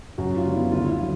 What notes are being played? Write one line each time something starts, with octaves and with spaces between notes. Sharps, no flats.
F#2 F#4
F4
D3 G3 B3
E4
D2 F4
E4
F4
D3 F#3